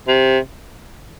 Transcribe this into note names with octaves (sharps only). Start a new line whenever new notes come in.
C3